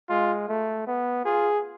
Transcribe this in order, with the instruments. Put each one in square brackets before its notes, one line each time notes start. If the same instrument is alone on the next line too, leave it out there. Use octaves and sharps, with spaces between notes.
[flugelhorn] G#3 [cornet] F4
[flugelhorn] A3
B3
[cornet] F4 [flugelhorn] G#4